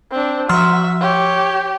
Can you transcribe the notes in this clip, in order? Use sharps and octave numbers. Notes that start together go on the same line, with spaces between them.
C4 D4
F3 F#4 E5 C6 F6
G4 C#5